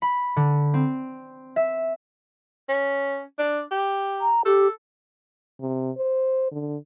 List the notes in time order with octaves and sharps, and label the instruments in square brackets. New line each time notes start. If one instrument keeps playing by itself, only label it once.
[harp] B5
D3
C4
E5
[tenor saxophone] C#4
D4
G4
[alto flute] A#5
[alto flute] G4 [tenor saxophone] A4
[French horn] C3
C5
D3